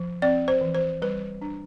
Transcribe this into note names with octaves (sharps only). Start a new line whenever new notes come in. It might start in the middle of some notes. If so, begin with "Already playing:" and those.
Already playing: F3
C4 D5
C5
E3
C5
G3 B4
D4